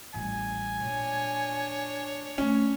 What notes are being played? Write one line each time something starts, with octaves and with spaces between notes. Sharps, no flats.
A1 G3 G#5
A#2 D4 C#5
A3 C4 C#4